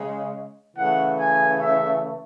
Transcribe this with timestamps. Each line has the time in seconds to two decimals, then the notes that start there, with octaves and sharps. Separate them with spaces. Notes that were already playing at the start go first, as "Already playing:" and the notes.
Already playing: C#3 G#3
0.75 C#3 E3 A3 F#5
1.17 G#5
1.61 E5